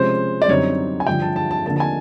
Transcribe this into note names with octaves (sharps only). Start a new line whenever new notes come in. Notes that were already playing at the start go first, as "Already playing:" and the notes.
Already playing: C3 F3 G#3 C#4 C5
D5
F#2 D3 G3 C4 D#4 C#5
G#5
G2 D3 F3 G5
A5
A5
A5
D3 F3 A#3 A5
A5
G#5